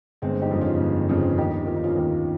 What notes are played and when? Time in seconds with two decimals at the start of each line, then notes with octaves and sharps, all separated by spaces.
0.22 G1 G#3 C4
0.42 D#4 G4
0.51 F2 C#3 F3
0.61 C#4 F4
0.80 G1
1.09 F2 C#3 F3
1.38 D#2 D#4 G4
1.67 D#3 F4
1.76 D#4
1.84 C#4 F4
1.96 D#2